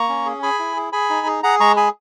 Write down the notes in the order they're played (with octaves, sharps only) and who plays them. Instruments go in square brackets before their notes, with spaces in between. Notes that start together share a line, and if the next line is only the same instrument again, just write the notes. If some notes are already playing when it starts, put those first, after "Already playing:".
Already playing: [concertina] A#3 A#5 C#6
C#4
G#4
G#4 G#5 B5
E4
G#4
G#4 G#5 B5
D#4
G#4
G#4 F#5 A#5
G#3 A#5 C#6
G#4 G#5 B5